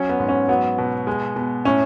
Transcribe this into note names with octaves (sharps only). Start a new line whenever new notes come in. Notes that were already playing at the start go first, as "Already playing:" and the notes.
Already playing: F#3 C#4
B3
G#2
C#4
F#3 B3
B2
G#3
B2
A2 C#4